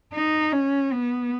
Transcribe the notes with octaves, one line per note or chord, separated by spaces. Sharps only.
D#4
C#4
B3